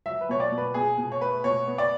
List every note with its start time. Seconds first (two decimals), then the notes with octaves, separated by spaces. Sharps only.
0.06 F#3 E5
0.21 B4
0.29 B2 C#5
0.40 D5
0.52 B2
0.58 B4
0.74 B2 G#4
0.98 B2
1.12 C#5
1.21 A3 B4
1.44 B2 C#5
1.67 B3
1.78 D5